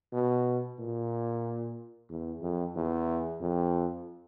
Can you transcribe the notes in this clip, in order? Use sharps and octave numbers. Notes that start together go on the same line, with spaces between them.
B2
A#2
E2
F2
E2
F2